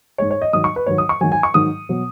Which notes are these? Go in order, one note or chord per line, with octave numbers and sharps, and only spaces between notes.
G#2 G#3 C#5
C#5
D#5
G#2 D#3 F#3 D#6
C#6
B4
G#2 D#3 F#3 C#5
D#6
C#6
G#2 D#3 F#3 G#5
G#5
C#6
G#2 D#3 F#3 D#6
B2 F#3